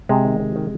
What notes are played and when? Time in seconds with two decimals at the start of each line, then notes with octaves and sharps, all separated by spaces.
0.09 C3 G#3
0.25 D#3
0.40 C3
0.56 D#3